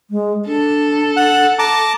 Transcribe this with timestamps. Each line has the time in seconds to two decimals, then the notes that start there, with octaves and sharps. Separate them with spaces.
0.11 G#3
0.47 D4 A4
1.17 F#5
1.59 A5 A#5 D6